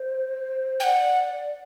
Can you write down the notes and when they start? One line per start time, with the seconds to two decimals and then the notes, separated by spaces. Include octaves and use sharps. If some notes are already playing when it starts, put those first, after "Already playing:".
Already playing: C5
0.80 G5
0.84 D5 F#5